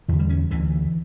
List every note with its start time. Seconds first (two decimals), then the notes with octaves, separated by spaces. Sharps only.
0.08 E2 D3 E3
0.19 G3
0.29 C#4
0.51 D2 D3 E3